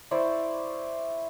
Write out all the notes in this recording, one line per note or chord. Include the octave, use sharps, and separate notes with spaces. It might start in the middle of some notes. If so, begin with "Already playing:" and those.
E4 C5 D5 C#6